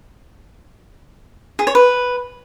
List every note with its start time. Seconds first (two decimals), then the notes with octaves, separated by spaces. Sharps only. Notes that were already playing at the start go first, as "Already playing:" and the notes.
1.59 G#4
1.67 C#5
1.75 B4